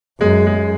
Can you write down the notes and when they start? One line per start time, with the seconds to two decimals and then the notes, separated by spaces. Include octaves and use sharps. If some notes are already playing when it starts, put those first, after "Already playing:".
0.21 F#2 G#3
0.47 G#3